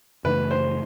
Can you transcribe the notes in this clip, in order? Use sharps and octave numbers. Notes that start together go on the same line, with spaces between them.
F#2 C#3 E3 A3 B4
C5